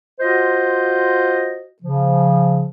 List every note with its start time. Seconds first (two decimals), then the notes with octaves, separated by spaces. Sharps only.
0.20 F4 F#4 C5 D#5
1.82 C#3 F3